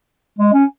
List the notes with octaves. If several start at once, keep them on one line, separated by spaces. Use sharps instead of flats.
G#3
C#4